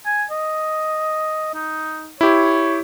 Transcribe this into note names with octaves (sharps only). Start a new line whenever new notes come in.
G#5
D#5
D#4
E4 G4 C#5